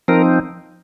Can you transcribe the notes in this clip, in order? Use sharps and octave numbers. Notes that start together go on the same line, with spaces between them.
F3 C4 D#4 A#4